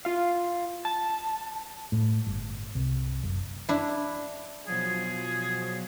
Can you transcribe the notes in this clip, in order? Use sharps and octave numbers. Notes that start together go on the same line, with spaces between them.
F4 F5
A5
A2
G1
C2
F#1
D4 E4
B2 F3 F#3 G#4